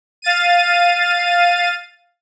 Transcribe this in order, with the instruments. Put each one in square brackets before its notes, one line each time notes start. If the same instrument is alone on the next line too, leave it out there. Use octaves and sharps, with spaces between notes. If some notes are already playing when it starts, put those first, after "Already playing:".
[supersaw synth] F5 A6 D#7